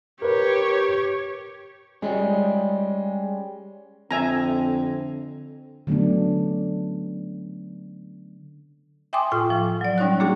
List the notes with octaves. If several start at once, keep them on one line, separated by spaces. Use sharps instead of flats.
G4 A#4 B4 C#5
G3 G#3 C#4
F2 D3 C4 E5 G#5 A#5
D3 F#3 A3 B3 C#4 D4
E5 G5 G#5 C6 D6 D#6
A2 F4 G5
F3
F#3 D5
G3 C#4 D#4 C#5 F#6
A#3 D4 F#4 G#4